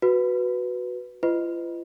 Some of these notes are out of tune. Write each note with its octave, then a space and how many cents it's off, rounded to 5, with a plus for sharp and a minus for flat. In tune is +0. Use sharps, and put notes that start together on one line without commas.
F#4 +0 B4 +0
F4 -40 B4 +40 D#5 +0